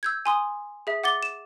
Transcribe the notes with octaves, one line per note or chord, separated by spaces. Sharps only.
E6 G6 G#6
G#5 C6 D#6
G#4 E5
F#5 D6 A6 G7
E7